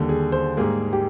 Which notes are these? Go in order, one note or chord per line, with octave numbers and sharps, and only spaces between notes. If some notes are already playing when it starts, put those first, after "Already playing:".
Already playing: D#2 D3 G3
G#4
C5
G#2 G3 A#3 G#4
G4